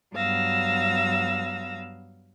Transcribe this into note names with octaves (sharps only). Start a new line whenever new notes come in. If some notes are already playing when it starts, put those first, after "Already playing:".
G2 F#3 B3 F5 E6 A#6